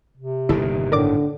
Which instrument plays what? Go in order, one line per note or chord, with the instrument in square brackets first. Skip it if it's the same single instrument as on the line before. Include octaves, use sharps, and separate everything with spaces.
[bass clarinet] C3
[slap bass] G1 A#2 D#3 [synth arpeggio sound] E4 A4
[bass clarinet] A2 [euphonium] D3 [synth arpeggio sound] A#4 D5 D6